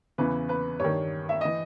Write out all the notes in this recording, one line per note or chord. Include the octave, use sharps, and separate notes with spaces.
E2 C#3 E3 B4
B4
G2 D#3 C#5
E5
E3 D#5